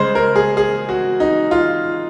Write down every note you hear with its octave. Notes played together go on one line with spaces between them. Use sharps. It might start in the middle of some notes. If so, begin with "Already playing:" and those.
Already playing: C#3 G#3 C5
A#4
G#4
G#4
F#4
D#4
F4